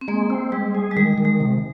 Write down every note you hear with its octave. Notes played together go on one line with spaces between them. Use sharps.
C4
G#3 A#3
C4
G3 G#3
G#4
G3
D#3 G#3
D#3
G#3
C3